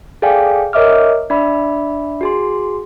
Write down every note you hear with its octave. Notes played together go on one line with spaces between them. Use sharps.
G#4 A4 D5 F5 G5 G#5
A#4 C#5 D#5 E5 D6 F6
D4 D5 E5 B5
F#4 G#4 C6